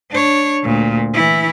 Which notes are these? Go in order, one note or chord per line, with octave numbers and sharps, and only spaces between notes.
D4 C#5
D2 A#2
E3 E4